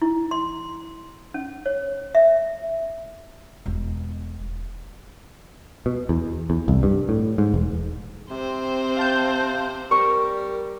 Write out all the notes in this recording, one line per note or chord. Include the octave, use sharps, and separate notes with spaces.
E4
C6
C#4
C#5
E5
E1 B2
B2
E2
E2
C2
G2
A2
G#2
E1
C3 C4 C5
F5 A5 G6
G3 A#4 C#6